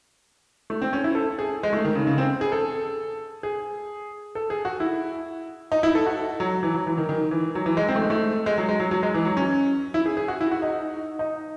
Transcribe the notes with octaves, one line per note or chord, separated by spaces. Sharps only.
A3
C4
C#4
E4
A4
G#4
G#3
A3
D#3
C#3
C#3
C4
G#4
A4
G#4
A4
G#4
F#4
E4
D#4
E4
A4
F#4
F#3
E3
F#3
E3
D#3
D#3
E3
F#3
E3
G#3
C4
A3
G#3
A3
G#3
F#3
G#3
F#3
F#3
G#3
E3
F#3
C#4
E4
G#4
G#4
F#4
E4
F#4
D#4
D#4